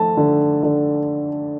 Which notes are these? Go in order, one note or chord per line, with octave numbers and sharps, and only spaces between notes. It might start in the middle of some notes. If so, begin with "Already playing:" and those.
Already playing: F3 A3 A5
D3
D3